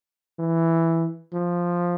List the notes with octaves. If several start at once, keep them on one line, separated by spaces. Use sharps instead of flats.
E3
F3